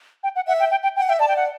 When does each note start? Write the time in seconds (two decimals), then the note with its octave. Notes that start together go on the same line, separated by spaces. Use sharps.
0.23 G5
0.36 F#5
0.47 E5 F#5
0.60 G5
0.71 G5
0.83 G5
0.96 F#5 G5
1.07 E5 G5
1.19 D5 A5
1.28 G5
1.36 F#5